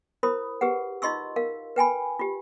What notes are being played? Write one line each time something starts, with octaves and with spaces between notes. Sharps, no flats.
E4 A#4 C5 B5 D#6
G4 G#4 B4 F#5
D#4 F4 D#5 C6 C#6 E6
A#4 F5
B4 G5 G#5 B5
F4 G4